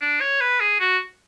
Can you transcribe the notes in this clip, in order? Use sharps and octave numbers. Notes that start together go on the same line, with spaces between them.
D4
C#5
B4
G#4
F#4